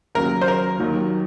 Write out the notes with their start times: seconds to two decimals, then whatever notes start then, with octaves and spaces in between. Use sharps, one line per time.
0.15 D#2 C#3 F#3 A#4
0.41 C5
0.48 A#4
0.80 D#2 D#3 F#3